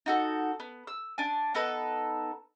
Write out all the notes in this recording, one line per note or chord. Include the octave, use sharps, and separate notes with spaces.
D#4 F#4 A4
B3
E6
D4 G#5
B3 D#4 A4 B4